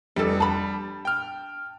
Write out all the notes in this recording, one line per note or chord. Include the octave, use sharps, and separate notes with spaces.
F1 G3 D4 A4
D4 A5 B5
G5 F6